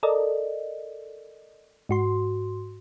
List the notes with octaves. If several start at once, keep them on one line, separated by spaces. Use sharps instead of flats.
A4 A#4 D5 D#5
G#2 F#4 C6